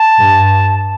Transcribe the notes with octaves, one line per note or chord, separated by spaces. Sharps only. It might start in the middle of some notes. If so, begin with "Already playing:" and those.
Already playing: A5
G2